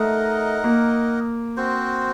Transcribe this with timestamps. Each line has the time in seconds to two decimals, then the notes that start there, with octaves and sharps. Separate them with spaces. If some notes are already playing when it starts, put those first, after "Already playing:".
Already playing: A3 D#4 A#4 D#5 F#5
0.64 A#3
1.57 C4 F#4 C5